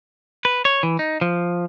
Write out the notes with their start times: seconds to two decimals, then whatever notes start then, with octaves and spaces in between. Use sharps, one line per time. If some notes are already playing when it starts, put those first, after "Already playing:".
0.45 B4
0.65 C#5
0.83 E3
0.99 D#4
1.21 F3